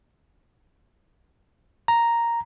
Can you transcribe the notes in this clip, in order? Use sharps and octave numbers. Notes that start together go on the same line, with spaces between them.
A#5